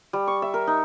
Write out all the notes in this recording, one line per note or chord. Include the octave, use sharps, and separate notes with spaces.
G3
C#6
E5
A#4
D#4